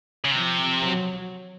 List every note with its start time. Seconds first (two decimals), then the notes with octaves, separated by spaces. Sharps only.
0.25 C#3
0.31 C3 F3
0.82 F#3